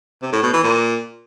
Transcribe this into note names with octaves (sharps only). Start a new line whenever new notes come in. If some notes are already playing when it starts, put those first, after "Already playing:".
C3
A2
B2
E3
A#2